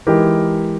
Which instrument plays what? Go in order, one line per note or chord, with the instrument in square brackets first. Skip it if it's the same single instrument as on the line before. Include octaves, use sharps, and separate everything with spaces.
[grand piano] E3 G#3 D#4 G4 A#4